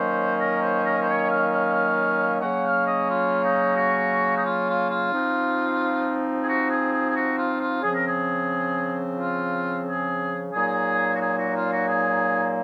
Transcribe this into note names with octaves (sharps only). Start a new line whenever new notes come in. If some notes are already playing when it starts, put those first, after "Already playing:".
Already playing: D#3 F#3 A#3 C#4 C5
A#4
C5
A#4
C5
C#5
F5
F5
F5
C#3 F#3 A#3 C#4 F#5
F5
D#5
F4
D#4
F#4
D#4
F4
F4
F4
F3 C4 D#4
G#4
F#4
G#4
G#4
G#4
F#4
F4
F4
C#3 F3 C4 G#4
A#4
G#4
F4
G#4
A#2 F#3 A#3 D#4 G#4
F#4
G#4
F#4
F4
F#4
G#4